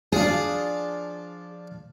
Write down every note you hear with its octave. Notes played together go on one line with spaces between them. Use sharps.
F3 D4 F4 G#4